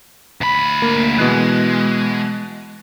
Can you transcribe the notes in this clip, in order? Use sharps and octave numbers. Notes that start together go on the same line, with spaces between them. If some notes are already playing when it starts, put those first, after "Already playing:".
D2 B5
A#3
B2 E3 G#3 F#6